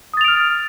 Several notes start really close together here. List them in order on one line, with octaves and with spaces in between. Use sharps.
D#6 A6 F7 D7 F6